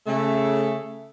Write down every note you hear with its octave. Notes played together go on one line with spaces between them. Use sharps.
C#3 A3